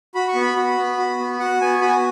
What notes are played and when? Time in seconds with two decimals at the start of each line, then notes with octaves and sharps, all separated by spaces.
0.15 F#4 B5
0.28 C#6
0.35 B3
0.41 B5
0.56 F#4
0.77 B3
0.98 F#4
1.19 B3
1.40 F#4 F#5
1.61 B3 G#5
1.81 F#4 B5
1.89 G#5